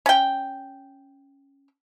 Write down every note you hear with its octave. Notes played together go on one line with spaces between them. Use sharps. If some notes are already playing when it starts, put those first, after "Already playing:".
C#4 G5